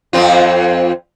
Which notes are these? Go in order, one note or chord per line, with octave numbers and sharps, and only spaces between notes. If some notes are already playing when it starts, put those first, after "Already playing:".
F2 C4 F4